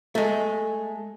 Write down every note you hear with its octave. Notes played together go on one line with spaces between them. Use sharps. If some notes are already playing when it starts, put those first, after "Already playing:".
G#3 A3